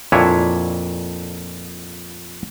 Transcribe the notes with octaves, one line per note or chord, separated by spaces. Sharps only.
F2 A#2 D4 E4 C#5 G#5